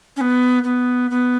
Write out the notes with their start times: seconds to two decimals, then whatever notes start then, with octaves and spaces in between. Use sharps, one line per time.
0.17 C#4
0.21 B3
0.64 B3
1.11 B3